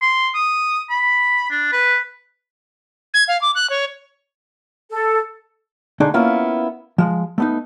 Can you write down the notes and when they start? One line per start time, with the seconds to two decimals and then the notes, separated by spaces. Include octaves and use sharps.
0.02 C6
0.35 D#6
0.90 B5
1.50 D4
1.72 B4
3.14 G#6
3.28 F5
3.42 D6
3.55 F#6
3.70 C#5
4.91 A4
6.00 D3 A3 D4 D#4 G#4
6.14 A#3 B3 C#4 E4 F4
6.98 F3 G#3
7.38 A3 B3 D#4